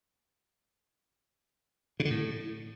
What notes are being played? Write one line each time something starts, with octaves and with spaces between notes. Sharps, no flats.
C#3
D3
A2